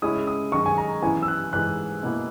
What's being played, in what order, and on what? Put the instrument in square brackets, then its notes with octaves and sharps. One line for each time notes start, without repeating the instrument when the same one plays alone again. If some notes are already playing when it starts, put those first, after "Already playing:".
[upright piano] C#3 G#3 C#4 E4 [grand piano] D#6
[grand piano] D#6
[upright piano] F#2 D#3 G#3 D#4 [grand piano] C#6
[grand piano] G#5
A#5
[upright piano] F#2 E3 B3 E4 [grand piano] G#5
[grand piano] E6
F#6
[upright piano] G#2 E3 G#3 [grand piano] F#6
[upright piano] B2 A#3 E4